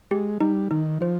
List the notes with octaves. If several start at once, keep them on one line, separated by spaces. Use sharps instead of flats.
G#3 G4
G3 D#4
D#3 D#4
F3 C5